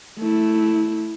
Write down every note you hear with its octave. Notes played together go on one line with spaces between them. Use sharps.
A3 E4